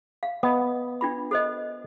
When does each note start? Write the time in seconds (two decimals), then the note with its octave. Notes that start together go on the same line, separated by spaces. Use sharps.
0.23 F5
0.43 B3 D#5 D#6
1.01 D4 F4 B5
1.31 A4 C5 D#5